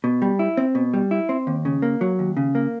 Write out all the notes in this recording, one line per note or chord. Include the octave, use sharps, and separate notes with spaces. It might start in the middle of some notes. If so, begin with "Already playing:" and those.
B2
G3
E4
C4
B2
G3
E4
C4
D#2
C#3
A#3
F#3
D#2
C#3
A#3